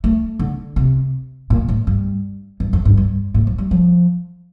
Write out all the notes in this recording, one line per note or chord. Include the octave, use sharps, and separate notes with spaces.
A3
D3
C3
A#2
A2
G2
G2
F2
G2
G2
A2
F3
G3
F3